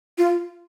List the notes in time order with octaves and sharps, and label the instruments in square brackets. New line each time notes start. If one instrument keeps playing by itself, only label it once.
[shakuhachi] F4